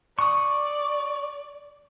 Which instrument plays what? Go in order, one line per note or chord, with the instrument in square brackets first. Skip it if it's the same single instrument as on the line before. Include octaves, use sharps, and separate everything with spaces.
[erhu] D5 [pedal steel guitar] C#6 D#6